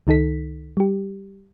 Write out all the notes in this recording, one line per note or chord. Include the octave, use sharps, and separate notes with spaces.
C#2 D#3 D#4 A4 B6
G3 G4